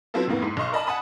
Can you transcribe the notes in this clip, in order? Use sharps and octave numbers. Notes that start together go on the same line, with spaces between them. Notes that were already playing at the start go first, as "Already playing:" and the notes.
F#3 B3 C4 E4 F4 A4
C2 F2 A2 A#3 B3
G#2
B1 D#5 C6 C#6
A#4 D5 D#5 G#5 A5 B5
F#5 G#5 A5 B5 D#6